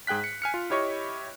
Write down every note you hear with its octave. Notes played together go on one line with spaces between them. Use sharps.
G#2 G#4 G5 F#6 B6
C#7
G#5 F6 C#7
F4
E4 G4 C#5 D#5 C#6